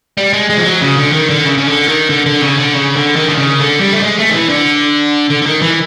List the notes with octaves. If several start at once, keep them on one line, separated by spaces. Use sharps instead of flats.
G3
G#3
G#3
F3
F#3
C#3
D3
D#3
D3
C#3
C#3
D3
D#3
D3
D3
C#3
D3
C#3
D3
D#3
D3
C#3
D3
G3
A3
G#3
A3
D#3
E3
D3
D3
D3
D#3
E3